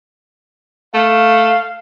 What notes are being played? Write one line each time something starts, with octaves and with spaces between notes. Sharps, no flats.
A3 F5